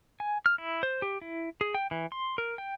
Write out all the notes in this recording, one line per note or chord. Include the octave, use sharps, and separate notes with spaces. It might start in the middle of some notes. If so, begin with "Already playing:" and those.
G#5
F6
E4
C5
G4
E4
G#4
G5
E3
C6
A#4
G5